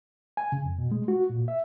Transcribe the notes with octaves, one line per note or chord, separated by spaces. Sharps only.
G#5
C#3
F2
B2
G#3
F#4
A#2
E5